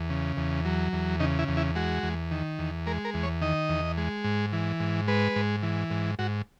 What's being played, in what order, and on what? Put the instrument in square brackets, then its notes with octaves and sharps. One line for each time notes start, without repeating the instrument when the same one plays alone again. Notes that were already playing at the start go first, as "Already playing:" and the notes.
Already playing: [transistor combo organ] E2
C#3
E2
F#3
E2
C#3 D#4
E4
E2
E4
G#3 F#4
E2
D#3
E2
G#3 A#4
A#4
E2
C#5
D#3 D#5
E2
G#3
G#2
E3
G#2
G#3 B4
G#2
E3
G#2
G#2 F#4